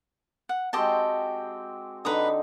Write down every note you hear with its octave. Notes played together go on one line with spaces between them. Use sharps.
F#5
G#3 C4 F#4 G4 D#5 A5
D3 D#4 B4 A#5 D#6